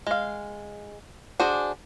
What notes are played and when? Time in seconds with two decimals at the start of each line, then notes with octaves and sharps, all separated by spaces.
0.07 G#3 F5
1.40 D4 F#4 G#4 C5